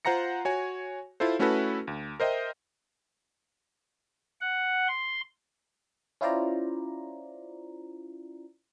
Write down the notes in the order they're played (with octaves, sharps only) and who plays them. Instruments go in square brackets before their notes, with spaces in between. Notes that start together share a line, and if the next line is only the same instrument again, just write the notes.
[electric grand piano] F4 C5 F#5 A#5 A#6 C#7
F#4 C#5 G#5
E4 F4 A4 C5
A3 C#4 E4 F#4 A4 B4
D2
A#4 C5 D#5 E5 G5
[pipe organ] F#5
C6
[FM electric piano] C#4 E4 F4 C5 D5 A#5